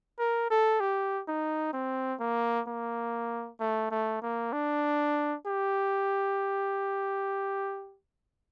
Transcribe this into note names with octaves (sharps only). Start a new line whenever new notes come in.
A#4
A4
G4
D#4
C4
A#3
A#3
A3
A3
A#3
D4
G4